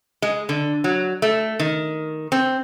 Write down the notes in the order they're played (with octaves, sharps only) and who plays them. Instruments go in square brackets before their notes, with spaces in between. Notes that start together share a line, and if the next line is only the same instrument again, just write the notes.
[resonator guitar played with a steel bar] G#3
D3
F#3
A3
D#3
C4